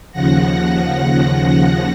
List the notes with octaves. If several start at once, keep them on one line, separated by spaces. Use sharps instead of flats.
D#2 C#3 F3 F#5 A#6